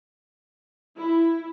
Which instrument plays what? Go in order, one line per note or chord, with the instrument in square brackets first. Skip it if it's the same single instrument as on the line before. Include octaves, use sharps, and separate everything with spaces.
[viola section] E4